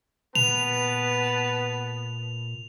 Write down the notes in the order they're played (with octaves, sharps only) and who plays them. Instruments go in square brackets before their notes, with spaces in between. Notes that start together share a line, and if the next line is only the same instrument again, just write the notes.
[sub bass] A#2 [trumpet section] B3 B4 A5 [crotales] F7